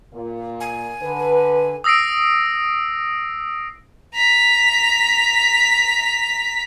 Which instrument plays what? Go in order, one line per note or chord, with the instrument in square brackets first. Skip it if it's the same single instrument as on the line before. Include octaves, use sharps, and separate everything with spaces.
[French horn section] A#2
[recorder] G#5
[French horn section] D3 B4
[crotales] D#6 E6 A#6 C7 D7
[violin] A#5 B6